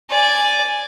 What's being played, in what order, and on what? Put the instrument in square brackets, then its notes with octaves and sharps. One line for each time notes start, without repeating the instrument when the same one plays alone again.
[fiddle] D5 G#5